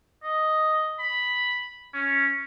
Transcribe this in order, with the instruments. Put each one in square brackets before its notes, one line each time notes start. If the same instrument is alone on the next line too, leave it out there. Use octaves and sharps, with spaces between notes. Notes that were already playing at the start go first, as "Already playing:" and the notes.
[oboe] D#5
B5
C#4